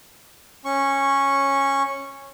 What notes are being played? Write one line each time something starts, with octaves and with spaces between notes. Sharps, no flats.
C#4 C#6